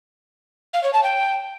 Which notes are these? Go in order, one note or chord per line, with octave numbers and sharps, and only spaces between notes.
F5
C#5
A5
G5